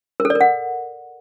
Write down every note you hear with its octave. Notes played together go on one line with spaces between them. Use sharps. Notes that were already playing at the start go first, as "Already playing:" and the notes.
A#4
A4
D5
A#4
F#5